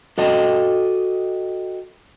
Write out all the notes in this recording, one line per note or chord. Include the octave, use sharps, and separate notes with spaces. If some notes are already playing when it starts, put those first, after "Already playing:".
F#4 A4 D#5 G5